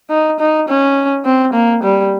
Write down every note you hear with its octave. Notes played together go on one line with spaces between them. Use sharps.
D#4
D#4
C#4
C4
A#3
G3